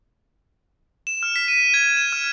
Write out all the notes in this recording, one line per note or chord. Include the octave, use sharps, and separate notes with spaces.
E7
F6
B6
D#7
G#6
E7
F6